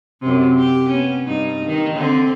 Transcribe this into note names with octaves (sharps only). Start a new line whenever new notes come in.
F#2 C3
G4
B3 C#4
G2 D#4
D#3
D3 C4